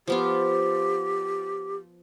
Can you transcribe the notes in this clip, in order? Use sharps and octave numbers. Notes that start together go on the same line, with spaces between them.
F3 B3 F4 G4